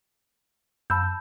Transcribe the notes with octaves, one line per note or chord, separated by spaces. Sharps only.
F#2 A5 B5 E6 G6